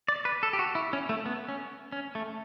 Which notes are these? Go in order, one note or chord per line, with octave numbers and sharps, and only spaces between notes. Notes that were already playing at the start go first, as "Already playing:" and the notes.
D5
B4
A4
G4
F#4
E4
C#4
A3
B3
C#4
C#4
A3